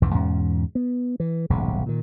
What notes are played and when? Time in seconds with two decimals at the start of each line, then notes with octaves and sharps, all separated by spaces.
0.02 C2 F2 G#2 E3
0.14 E2 G#2 B2 C#4
0.75 B3
1.20 E3
1.50 D#1 B1 G#2 C#3
1.86 A#2 D#3